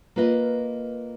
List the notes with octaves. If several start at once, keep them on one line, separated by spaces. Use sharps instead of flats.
A#3 F4 B4 D#5